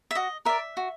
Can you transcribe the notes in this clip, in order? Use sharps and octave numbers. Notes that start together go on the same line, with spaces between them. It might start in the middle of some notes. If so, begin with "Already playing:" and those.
E5
F#4 D#5
A#4 D5 E5
F#4